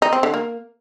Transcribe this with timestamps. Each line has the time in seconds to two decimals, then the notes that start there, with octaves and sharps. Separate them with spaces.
0.02 D#4
0.13 C4
0.23 D3
0.34 A#3